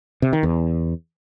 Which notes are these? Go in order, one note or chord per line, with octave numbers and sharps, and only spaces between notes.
C3
D#3
E2